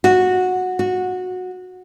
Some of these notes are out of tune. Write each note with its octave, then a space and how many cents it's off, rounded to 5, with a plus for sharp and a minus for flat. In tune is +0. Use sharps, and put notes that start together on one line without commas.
F#4 -10
F#4 -15